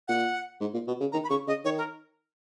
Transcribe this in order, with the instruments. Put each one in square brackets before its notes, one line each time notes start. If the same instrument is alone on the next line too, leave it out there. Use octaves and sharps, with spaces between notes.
[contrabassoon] A#2 [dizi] F#5
[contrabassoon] G#2
A#2
B2
C#3
[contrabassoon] D#3 [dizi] A#5
[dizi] B5
[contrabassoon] C#3 [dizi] C#6
[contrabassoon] C#3 [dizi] D#5
[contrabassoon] D#3 [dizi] C#5
[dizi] A#4